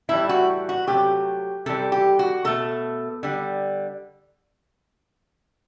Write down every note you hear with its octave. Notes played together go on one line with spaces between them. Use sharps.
A2 E3 G3 E4
F#4
F#4
C3 F#3 A3 G4
C3 E3 G3 A4
G4
F#4
B2 A3 A4
D3 G3